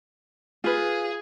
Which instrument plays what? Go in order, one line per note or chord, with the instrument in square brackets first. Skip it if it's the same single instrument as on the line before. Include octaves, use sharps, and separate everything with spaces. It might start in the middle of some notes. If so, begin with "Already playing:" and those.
[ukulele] F4 B4 [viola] G#4